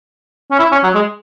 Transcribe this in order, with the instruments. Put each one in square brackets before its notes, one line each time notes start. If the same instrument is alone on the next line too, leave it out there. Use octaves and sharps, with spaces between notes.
[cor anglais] C#4
E4
C#4
F#3
G#3